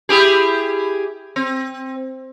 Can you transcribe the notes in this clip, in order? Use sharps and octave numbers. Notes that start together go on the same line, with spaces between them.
E4 G4 G#4
C4